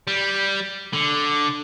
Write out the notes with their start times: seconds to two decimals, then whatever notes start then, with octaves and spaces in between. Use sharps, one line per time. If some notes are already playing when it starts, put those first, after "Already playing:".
0.07 G3
0.93 D3